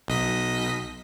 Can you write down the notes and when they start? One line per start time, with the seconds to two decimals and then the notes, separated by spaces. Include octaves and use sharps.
0.08 B1 D#5 B6